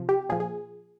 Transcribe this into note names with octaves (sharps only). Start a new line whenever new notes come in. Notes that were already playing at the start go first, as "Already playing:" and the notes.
Already playing: C3 F3
G4
A#2 F3 G#4
G#4